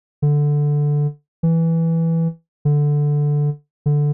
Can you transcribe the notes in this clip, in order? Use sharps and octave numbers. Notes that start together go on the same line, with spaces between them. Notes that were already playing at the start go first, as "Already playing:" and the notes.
D3
E3
D3
D3